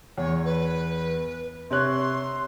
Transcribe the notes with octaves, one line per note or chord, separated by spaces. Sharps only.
E2 C#5
B4
C3 C#5 C6 F#6